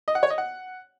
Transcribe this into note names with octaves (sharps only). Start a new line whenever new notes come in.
D#5
F#5
C#5
D#5
F#5